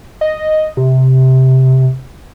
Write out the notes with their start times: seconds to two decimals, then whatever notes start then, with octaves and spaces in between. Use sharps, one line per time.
0.21 D#5
0.77 C3